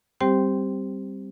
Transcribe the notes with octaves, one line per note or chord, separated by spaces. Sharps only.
G3 C4 G4 C5 G5